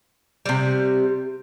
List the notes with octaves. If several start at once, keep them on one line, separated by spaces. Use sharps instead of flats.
C3 G3